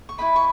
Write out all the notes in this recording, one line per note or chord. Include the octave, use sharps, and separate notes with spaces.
C#6
E4 B4 D#5 B5
C#6